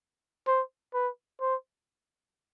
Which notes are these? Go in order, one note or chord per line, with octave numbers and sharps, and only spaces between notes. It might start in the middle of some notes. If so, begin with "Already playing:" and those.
C5
B4
C5